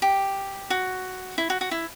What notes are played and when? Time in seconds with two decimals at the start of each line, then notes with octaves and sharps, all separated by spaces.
0.02 G4
0.70 F#4
1.38 E4
1.50 F#4
1.61 F#4
1.71 E4